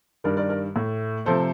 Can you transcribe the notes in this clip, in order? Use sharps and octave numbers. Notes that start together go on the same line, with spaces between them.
G2 D#3 G3 A#4 D5
A#4 D5
A#4 D5
A2 A3
C3 F3 A3 A4 C5